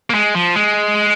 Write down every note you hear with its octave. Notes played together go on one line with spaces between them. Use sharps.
A#3
G#3
F3
G#3